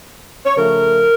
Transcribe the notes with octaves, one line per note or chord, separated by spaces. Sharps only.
C#5
C#3 F3 A3 A#4